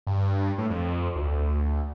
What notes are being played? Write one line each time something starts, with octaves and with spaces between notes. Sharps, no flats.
G2
A2
F2
D2